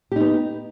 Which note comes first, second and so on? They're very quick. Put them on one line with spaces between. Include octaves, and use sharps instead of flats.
G4 D#4 B3